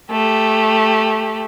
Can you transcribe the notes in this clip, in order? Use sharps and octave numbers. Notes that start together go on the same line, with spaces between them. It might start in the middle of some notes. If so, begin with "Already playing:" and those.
A3 G4